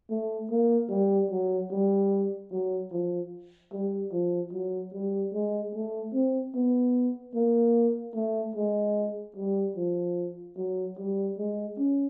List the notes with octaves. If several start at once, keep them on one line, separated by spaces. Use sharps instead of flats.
A3
A#3
G3
F#3
G3
F#3
F3
G3
F3
F#3
G3
G#3
A3
C4
B3
A#3
A3
G#3
G3
F3
F#3
G3
G#3
C#4